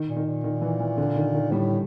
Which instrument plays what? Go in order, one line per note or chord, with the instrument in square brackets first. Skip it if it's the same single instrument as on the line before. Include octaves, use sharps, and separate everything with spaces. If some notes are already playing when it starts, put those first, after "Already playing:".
Already playing: [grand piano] D#3
[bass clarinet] A#2
[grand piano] D#3
[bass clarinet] A#2
[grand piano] D#3
E3
E3
D3
D#3
D#3
[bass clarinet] A2 [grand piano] G3